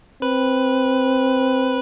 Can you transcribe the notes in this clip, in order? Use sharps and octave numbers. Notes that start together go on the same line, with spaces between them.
C4 B4